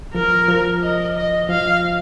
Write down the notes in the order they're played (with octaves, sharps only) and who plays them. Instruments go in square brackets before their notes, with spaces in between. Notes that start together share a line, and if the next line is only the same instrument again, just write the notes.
[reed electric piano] F3 [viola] A#4
[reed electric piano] F3
[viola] D#5
D#5
[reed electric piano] F3 [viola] F5